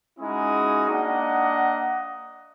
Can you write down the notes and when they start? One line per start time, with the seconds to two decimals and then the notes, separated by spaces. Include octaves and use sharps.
0.20 G#3 C#4 D#4 E4 F#4 D#6
0.88 A#3 D4 D#5 F#5